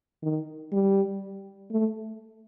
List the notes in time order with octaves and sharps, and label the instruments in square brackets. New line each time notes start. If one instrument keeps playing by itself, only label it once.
[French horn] D#3
G3
A3